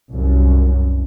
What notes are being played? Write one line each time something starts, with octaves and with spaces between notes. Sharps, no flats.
C2 F#2